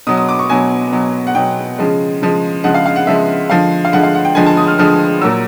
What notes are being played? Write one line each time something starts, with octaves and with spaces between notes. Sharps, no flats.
B2 F#3 D#6
D#6
D6
C#6
B2 F#3 G#5
B2 F#3
F#5
B2 F#3 G5
C#3 F3 G#3
C#3 F3 G#3
C#3 F3 G#3 F#5
F5
F5
F#5
C#3 F3 G#3 E5
D3 F3 G#3 F5
F5
D3 F3 G#3 F#5
F5
F#5
G5
D3 F3 G#3 G#5
A5
D#6
F6
D3 F3 G#3 F6
A#2 F#3 E6